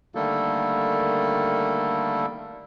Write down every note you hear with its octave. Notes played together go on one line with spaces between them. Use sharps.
D3 D#3 G3 A3 A#3 A4